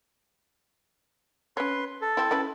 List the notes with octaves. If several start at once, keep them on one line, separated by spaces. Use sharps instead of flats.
C#4 B4 C#5 C6
A4
C4 E4
C#4 E4 B4